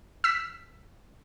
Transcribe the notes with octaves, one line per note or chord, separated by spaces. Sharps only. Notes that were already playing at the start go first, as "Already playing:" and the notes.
E6 B6